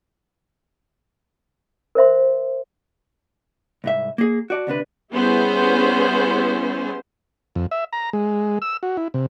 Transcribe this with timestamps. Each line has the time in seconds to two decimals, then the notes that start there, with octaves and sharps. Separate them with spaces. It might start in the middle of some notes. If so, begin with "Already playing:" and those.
1.95 A#4 C5 E5 C6
3.84 C2 G#2 E5
4.18 A#3 G#4
4.50 F#4 D5 A5
4.67 D2 C3 D4 B4
5.13 G3 B3 C#4 E4 G#4 C5
7.56 F2
7.71 E5
7.93 A#5
8.13 G#3
8.62 E6
8.83 F#4
8.97 E4
9.14 C3